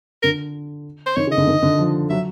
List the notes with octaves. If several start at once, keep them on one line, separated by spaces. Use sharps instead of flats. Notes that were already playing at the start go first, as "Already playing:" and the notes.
D3 A#4
C5
D#3 C#5
C#3
D#5
D3
D#3
D3
F3
F#3 E5